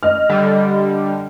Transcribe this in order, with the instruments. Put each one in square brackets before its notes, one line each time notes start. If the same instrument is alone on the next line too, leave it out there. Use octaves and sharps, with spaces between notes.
[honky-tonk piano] D#5 F6
[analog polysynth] D3 G3